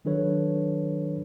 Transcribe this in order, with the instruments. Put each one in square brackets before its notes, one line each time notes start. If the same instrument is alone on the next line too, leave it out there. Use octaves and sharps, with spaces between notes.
[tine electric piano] D#3 F#3 D4 A4 B4 C#5